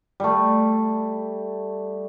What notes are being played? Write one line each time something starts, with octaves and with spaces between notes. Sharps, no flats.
G3 A3